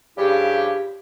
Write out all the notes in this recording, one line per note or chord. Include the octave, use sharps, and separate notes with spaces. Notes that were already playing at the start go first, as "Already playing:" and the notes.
G2 C#3 F3 E4 G4